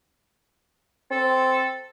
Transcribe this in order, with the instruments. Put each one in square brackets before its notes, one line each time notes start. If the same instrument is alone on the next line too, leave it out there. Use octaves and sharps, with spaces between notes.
[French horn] C4 [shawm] A4